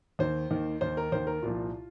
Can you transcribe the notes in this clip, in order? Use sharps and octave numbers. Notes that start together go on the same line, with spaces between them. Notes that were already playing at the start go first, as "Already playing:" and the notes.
D#2 D#3 C5
D#2 D#3
D#2 D#3 C5
A#4
D#2 D#3 C5
A#4
C2 A#2 F3 F4